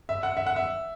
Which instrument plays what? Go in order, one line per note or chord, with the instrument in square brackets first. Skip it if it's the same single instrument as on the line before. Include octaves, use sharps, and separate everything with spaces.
[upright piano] E5
F#5
E5
F#5
E5